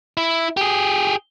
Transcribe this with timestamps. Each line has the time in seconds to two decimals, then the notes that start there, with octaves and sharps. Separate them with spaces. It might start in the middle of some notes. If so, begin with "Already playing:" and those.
0.17 E4
0.57 G4 G#4